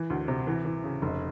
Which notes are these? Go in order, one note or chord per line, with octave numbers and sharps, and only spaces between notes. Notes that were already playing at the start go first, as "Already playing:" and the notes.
Already playing: E3
D2
C3
E3
E3
C#3
F1